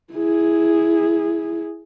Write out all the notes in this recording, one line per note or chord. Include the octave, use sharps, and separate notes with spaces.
E4 G#4